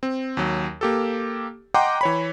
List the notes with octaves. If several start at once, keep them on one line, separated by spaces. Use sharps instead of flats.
C4
D#2 F#3
A#3 G4 A4
D#5 F#5 G5 A#5 C6 D6
E3 C#5 B5